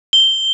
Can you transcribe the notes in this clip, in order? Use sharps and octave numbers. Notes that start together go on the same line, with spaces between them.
G7